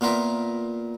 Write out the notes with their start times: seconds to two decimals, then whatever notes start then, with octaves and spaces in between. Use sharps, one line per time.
0.01 A#2 B3 F4 A#4 E5